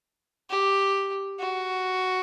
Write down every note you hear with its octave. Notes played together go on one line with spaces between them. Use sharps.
G4
F#4